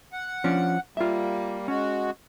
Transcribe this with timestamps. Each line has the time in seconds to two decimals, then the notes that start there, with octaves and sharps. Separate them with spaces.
0.13 F#5
0.44 F3 C#4 D4
0.97 G3 A#3 F4 E5
1.68 G#3 C#4 F#4